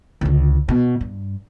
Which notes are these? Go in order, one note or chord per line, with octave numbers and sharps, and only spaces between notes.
C#2 D3
B2
G2